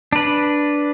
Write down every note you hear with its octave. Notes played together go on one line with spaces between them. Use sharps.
D4 B4